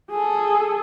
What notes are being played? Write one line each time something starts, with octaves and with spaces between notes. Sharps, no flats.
G#4 A4